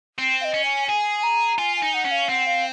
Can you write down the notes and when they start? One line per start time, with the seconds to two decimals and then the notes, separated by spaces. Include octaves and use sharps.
0.18 C4
0.41 F5
0.45 D#5
0.54 C#4
0.65 G#5
0.88 G#4 G#5
1.23 A#5
1.58 F4 G#5
1.77 G#5
1.82 D#4
1.94 F#5
2.05 C#4
2.11 F5
2.29 C4 F#5
2.47 F5